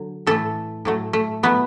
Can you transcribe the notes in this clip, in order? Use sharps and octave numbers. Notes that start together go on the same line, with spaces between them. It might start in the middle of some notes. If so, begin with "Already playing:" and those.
Already playing: D3 F#3
A2 E3 A3 A4
A2 F#3 A3
A3
A2 F#3 A3 B3